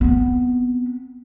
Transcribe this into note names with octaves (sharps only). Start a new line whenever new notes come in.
B3 C4